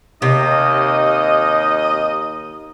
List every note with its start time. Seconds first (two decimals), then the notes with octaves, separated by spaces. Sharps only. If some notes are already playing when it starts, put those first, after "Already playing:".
0.22 D#2 C3 D#4 D#5